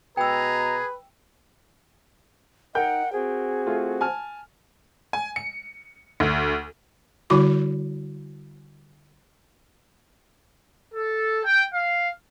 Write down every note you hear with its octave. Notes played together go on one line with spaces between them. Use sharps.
B2 G#4 B4 G5 A#5 E6
D#4 A#4 F#5 G5 G6
C4 F#4 G#4
A3 F4
G#5 A5 F6
G#5
C#7
D2
D3 G3 E4 F#4 C#5 D6
A4
G5
F5